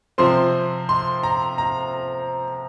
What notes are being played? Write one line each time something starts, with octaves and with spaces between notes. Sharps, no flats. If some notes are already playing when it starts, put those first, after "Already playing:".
C3 F3 C4 C6
C6
A#5
A#5